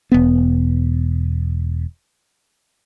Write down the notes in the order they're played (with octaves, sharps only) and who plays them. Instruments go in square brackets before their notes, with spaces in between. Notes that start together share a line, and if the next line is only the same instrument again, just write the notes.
[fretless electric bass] E1 B3